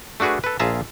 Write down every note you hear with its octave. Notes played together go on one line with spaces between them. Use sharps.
A3 D4 F#4 G#4 B4
A4 B4
A#1 F4 G#4 E5 A5 A#5